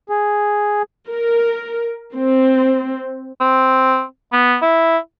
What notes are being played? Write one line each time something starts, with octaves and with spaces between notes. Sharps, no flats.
G#4
A#4
C4
C4
B3
E4